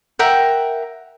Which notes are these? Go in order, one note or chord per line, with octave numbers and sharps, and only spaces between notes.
A#4 E5 F#5 G5